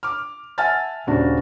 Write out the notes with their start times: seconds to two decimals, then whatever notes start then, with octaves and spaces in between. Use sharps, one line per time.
0.03 D6 F6
0.58 E5 F#5 G#5 A5 F6 A6
1.07 D#1 C#3 D4 F#4